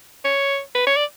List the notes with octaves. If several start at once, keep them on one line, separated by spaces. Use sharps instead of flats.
C#5
B4
C#5
D5